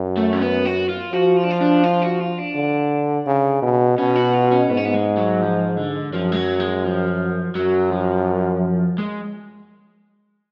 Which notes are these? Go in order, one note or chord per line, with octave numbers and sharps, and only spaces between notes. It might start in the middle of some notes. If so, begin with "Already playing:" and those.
Already playing: F#2
A3
C#4
B3
F#4
F4
F3 F#4
F4
D4
F4
D4
F4
F#4
F4
D4
D3
C#3
B2
B2 C#4
F#4
F4
C#4
G#2 B3
C#4
B3
G#3
F#3
F3
D3
F#2 F3
G#3
F#3
G#3
F3
F#2 F#3
F3
G#3